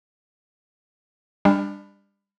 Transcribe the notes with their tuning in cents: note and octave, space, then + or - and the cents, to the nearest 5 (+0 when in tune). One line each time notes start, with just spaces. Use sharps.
G3 +30 D4 +0